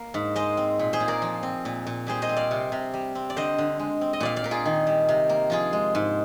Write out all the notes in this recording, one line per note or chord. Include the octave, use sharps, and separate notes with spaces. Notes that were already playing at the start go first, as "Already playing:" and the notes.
Already playing: A#3
G#2
G#3 C5 D#5
C4
A#2
G#4 C5
A#2
A#4 D5
F3
C4
A#2
A#2
G3 G#4 C5
C5 D#5
C4
D5 F5
C3
C3
G3
C4
D5
D3 C5 D#5
D3
G#3
C4
D#5
A#2 D5 F5
D5 F5
A#2 A#4
F4 G#4
D#3
G3
C3
A#3
F3 F4 G#4
G#3
G#2